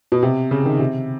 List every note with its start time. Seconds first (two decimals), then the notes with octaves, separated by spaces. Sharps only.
0.12 B2
0.23 C3
0.51 C#3
0.65 D#3
0.80 C3